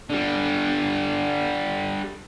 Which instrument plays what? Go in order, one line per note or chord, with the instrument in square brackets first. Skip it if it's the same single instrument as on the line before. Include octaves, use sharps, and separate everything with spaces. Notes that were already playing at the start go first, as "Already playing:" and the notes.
[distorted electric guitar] D3 G3